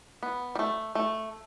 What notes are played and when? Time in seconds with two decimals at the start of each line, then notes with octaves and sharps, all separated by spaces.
0.23 B3
0.55 G3
0.59 A3
0.95 A3